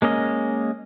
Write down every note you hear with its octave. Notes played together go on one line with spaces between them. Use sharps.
G#3 A#3 C#4 D#5